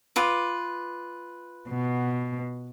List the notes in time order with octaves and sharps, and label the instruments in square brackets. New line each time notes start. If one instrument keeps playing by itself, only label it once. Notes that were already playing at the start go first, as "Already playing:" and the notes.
[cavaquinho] F4 B4 D6
[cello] B2